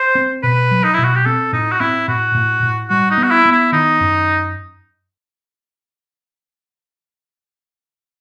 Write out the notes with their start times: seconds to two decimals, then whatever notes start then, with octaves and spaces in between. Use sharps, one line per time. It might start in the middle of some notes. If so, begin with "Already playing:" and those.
Already playing: C5
0.15 C4
0.43 B2 B4
0.71 F#3
0.84 D#4
0.94 B2 E4
1.04 F#4
1.15 G4
1.25 C4 A4
1.53 A2 D#4
1.72 F#4
1.80 C4 E4
2.08 A2 F#4
2.35 A2
2.63 A2
2.89 G3 F#4
3.10 D#4
3.18 B3
3.23 F#4
3.31 E4
3.45 B3
3.52 E4
3.72 D#3 D#4
4.00 F#2